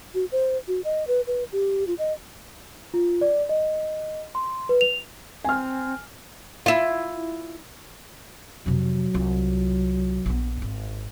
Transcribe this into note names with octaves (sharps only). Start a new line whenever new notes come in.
F#4
C5
F#4
D#5
B4
B4
G4
F4
D#5
F4
D5
D#5
C6
B4
F7
C4 G#5 F6
E4 F4
F2 C3 F#3
C2 F4
A#1 B3
G#1